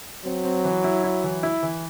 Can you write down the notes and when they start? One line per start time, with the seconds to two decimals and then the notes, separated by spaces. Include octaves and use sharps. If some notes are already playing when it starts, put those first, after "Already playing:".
0.25 F#3 C4
0.45 C4
0.64 E3
0.84 E4
1.04 E4
1.24 E3
1.43 E4
1.63 E3